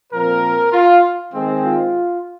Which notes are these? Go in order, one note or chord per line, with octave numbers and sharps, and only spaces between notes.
A#2 F3 C4 A#4
F4
D#3 G#3 C4
F4